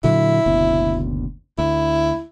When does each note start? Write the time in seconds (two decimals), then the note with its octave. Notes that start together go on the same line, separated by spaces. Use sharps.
0.04 A#2 D3 F#3 E4
0.46 F#1 D2 B2
1.58 D2 E4